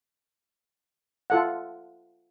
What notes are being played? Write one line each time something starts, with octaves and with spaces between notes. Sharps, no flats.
F4 A4 F#5